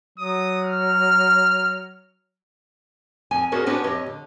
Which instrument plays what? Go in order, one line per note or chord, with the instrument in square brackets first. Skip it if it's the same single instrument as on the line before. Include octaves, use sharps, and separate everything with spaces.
[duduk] F#3 [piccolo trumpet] D#6
[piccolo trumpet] F6
[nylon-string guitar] F2 G#5
B3 C#4 F#4 G#4 A#4 C5
B3 C#4 D4 F#4 B4 C5
F2 G4 C#5 D#5
D3